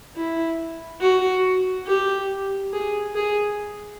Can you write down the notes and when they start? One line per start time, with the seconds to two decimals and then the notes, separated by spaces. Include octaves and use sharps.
0.16 E4
1.01 F#4
1.87 G4
2.73 G#4
3.15 G#4